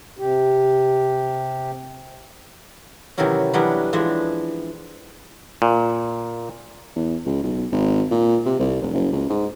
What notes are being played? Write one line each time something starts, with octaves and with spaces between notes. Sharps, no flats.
C3 G4
C3 D#3 E3 F#3 C#4
E3 F#3 G3 B3 C#4 D4
E3 F3 G#3 D4
A#2
E2
C#2
B1
G#1
A#2
C3
C2
F1
F#1
C#2
G#2